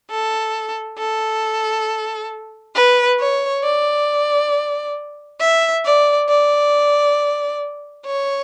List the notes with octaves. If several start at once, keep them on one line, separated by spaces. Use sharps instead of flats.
A4
A4
B4
C#5
D5
E5
D5
D5
C#5